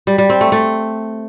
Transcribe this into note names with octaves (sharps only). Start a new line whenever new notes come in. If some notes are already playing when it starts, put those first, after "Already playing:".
G3
G3
C4
A3
A3